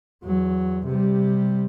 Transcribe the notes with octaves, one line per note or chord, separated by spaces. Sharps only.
E2 F#3
C3 G3